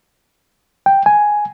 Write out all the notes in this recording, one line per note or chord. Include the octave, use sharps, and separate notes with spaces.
G5
G#5